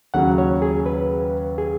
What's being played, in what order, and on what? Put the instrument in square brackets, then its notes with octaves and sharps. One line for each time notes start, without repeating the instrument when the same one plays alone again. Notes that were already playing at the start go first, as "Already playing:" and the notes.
[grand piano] D#2 C#3 F#3 C#4 [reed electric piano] F#5
[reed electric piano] C#5
G#4
B4
G#4